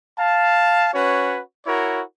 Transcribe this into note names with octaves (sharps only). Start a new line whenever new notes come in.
F5 A5
C#4 F#4 B4 C#5
E4 F#4 A#4 C#5